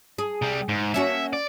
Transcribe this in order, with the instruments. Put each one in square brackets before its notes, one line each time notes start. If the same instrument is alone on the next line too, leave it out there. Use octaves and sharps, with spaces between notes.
[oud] G#4
[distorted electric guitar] C3 G3
G#2
[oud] A#3 C#4 F#4 [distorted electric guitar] E5
[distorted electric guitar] D5